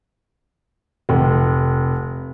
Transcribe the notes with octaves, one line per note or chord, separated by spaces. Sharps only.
F1